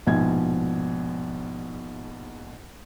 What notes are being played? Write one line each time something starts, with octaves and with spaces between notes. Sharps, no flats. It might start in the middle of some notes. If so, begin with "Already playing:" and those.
A#1 G#2 B2 F3 G#5 G#6